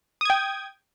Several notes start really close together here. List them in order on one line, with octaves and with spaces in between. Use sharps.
D#6 G#6 G5